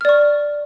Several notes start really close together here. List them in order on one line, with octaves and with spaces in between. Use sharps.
F6 D5 C#6